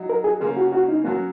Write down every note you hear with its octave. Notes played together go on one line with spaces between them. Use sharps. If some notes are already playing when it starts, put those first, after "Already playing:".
Already playing: F#3 D#4 F#4
A#4
G#4
C#3 A#3 C#4 G#4
F#4
F#4
D#4
F#3 A#3 C#4 F#4